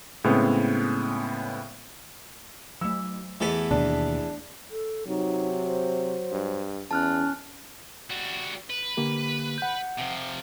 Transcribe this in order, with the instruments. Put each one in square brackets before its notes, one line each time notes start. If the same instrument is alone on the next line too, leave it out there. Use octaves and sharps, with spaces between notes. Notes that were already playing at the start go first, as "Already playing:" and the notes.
[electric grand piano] A2 C#3 G#3 B3 C4
[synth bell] F#3 A3 [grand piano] E6
[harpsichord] E2 E3 A4 [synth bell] A3 B6
[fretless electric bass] D#2 B2 [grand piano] D4
[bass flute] A4
[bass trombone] C3 [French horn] F#3 [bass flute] D#4
[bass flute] C5
[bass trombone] G2
[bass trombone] E2 [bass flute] C#4 [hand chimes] A5 F6 F#6
[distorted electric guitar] G3 F#4
B4
[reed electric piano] D3 A#3 G4
F#5 G6
[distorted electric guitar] C3 F3